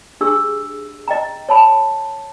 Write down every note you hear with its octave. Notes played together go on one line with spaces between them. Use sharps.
D4 G4 G#4 E6
D#5 G5 A#5
C#5 A5 B5